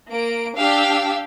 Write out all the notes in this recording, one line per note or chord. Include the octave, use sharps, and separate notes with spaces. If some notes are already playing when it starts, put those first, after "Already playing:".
A#3 D7
D4 G4 F5 E6